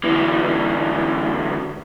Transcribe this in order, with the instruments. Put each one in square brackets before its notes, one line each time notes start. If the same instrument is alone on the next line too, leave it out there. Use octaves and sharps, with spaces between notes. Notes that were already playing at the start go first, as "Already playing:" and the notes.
[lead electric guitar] D2 E3